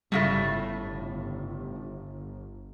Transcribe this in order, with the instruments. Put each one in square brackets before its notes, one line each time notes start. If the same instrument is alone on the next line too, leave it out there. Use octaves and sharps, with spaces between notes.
[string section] G1 [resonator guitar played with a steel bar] A2 C#3 A3 [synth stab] G3 F4